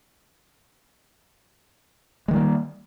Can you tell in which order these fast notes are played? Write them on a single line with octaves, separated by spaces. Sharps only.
G#3 D#3 G3 A#3